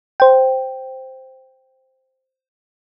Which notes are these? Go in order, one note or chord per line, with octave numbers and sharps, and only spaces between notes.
C5 G5